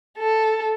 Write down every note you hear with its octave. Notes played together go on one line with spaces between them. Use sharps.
A4